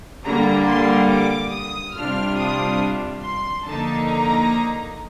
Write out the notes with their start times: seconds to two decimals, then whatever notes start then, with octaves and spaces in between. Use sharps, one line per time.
0.25 D3 G3 A#3 A#5
0.68 C6
1.10 D6
1.52 D#6
1.95 C3 G3 D4 F4 F6
2.37 D#6
3.22 C6
3.64 D3 F3 A#3 D#4 A5
4.06 A#5